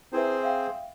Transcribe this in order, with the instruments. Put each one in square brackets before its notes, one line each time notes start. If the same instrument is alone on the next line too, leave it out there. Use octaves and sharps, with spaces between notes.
[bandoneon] C4 G#4 C5 [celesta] E4 B4 E5
[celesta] E5 F5 G5